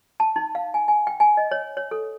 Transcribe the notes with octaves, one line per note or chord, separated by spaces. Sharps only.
A5
D#4
F5
G#5
G#5
G5
G#5
D#5
C#5
C#5
A4